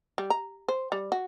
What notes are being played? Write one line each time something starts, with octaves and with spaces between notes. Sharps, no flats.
G3
A#5
C5
G3
F#4